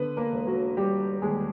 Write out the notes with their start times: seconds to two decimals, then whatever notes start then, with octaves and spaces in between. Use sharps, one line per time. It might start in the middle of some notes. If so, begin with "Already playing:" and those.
Already playing: D3 B3 B4
0.17 A#3 A#4
0.33 E1
0.47 F#3 F#4
0.77 G3 G4
1.22 D#2 G#3 G#4